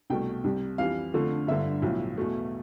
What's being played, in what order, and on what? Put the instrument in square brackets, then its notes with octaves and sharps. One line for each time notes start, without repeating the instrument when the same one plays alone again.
[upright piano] C2 B2 A3 G5
C2 C3 G3
F2 E3 G3 F5
F2 D3 F3 A3
G1 G2 D3 E5
B1 A2 F3
E2 B2 A3